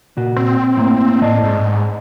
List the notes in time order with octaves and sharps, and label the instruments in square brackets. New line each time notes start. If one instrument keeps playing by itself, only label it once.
[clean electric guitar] A#2 F#4
[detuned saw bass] C4
[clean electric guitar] A2 A#3
[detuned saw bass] A2 [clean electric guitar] D5 D#5 A5
[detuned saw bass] G#2